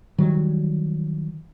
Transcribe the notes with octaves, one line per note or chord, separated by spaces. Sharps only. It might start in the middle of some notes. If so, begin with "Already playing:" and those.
D#3 E3 F#3 G3